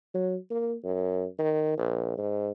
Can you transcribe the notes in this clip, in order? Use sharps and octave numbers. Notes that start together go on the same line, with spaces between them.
F#3
A#3
F#2
D#3
A#1
G#2